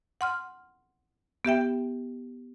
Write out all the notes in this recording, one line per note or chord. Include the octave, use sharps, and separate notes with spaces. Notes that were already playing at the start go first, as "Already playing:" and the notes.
F#5 C6 F6
B3 G4 E5 G5